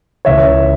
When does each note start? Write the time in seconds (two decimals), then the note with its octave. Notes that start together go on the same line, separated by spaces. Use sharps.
0.25 C#2 C#3 E3 C#5 E5